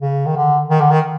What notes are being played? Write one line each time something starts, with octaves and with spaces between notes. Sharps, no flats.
C#3
D#3
D3
D#3
D3
D#3